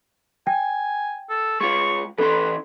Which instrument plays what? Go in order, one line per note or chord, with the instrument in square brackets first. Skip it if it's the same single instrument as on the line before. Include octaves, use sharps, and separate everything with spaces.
[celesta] G5 [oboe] G#5
[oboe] A4
[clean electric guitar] G#3 F4 [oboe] C#6
[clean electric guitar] E3 C#4 C6 [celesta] A4 [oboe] B4